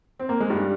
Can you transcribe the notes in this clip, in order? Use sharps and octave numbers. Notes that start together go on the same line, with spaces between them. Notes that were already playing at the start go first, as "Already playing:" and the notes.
C4
A#3
G#3
G2 G3